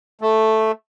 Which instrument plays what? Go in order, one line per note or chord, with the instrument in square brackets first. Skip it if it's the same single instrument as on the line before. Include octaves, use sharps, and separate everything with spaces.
[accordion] A3